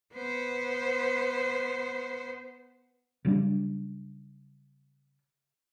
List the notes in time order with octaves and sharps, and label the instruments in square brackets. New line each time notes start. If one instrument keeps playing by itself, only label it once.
[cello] B3 C5
[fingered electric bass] C#3 F#3 G3 D4